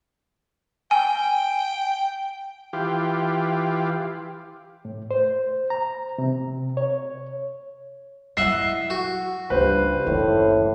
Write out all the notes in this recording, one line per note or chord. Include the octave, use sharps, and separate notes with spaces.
G5 G#5
E3 F4 G4
A2
C5
A#5
C3
C#5
F#3 E4 D#5 E5 F#5 C7
F#4
C#2 G2 B4 C5
F#1 A2 D#3